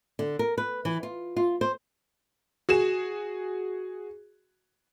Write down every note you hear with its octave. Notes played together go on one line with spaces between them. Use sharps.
D3
A#4
B4
E3
F4
F4
C5
F#4 G#4 E7